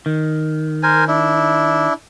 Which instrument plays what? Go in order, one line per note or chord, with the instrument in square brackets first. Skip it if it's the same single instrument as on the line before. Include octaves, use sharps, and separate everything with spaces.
[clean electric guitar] D#3
[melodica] A#4 C5 G#5
D4 E4